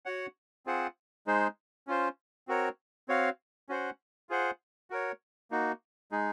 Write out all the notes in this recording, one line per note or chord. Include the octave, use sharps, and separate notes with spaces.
F#4 C#5 F#5
C4 F4 G#4 C5 F#5
G#3 D#4 G#4 C5
C#4 F4 C5
C4 F#4 A#4 C#5
C4 F#4 C#5 F5
C#4 F#4 C5 F#5
F4 G#4 C5 F#5
F#4 A#4 C#5
A#3 D#4 F#4
G#3 D#4 G#4